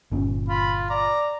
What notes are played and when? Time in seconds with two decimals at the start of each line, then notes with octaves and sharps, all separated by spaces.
0.12 G1 A#2 C#4
0.49 F4 B5
0.90 D5 A#5